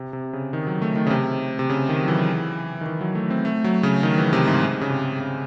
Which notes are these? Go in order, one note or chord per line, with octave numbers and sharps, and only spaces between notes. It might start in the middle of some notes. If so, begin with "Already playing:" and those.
Already playing: C3
C3
C#3
D#3
F#3
A3
D#3
C#3
C3
C3
C#3
D#3
F#3
E3
D#3
E3
F#3
A3
C4
A3
F#3
C#3
D#3
E3
C3
G#2
C#3
C3
C#3